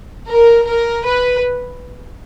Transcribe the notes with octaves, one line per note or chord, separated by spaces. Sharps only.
A#4
A#4
B4